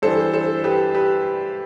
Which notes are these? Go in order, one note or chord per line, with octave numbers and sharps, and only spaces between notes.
G2 E3 A4 C5
A4 C5
G4 B4
G4 B4